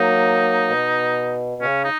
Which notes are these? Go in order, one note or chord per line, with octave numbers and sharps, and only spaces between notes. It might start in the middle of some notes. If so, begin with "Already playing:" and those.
Already playing: F#3 A#3 D#4
B2
C#3 C#4
D#4